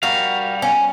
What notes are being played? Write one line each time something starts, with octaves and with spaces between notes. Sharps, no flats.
G3 F#4 A#4 F5
C#4